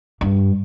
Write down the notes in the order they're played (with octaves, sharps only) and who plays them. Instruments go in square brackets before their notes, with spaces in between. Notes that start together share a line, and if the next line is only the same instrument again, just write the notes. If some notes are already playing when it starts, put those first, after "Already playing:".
[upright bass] G2